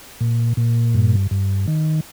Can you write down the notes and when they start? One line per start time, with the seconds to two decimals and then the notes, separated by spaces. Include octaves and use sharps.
0.21 A#2
0.57 A#2
0.94 G2
1.31 G2
1.68 D#3